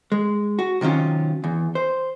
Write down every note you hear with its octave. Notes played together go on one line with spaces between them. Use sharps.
G#3
F#4
C3 D#3 F#3 C#4 F4
E2
C5